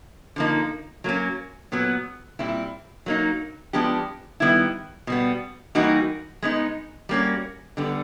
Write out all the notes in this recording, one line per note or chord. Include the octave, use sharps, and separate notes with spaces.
D3 F3 A#3 D#4
F#3 A#3 C#4
A#2 F#3 B3
A#2 G3 C4 E4
F#3 A#3 D#4
F3 G#3 B3 D4 G4
D#3 G3 B3 E4
B2 G3 B3
E3 G3 A#3 D#4 F#4
G#3 B3 D#4
G3 A#3 C#4 F#4
D3 G3 B3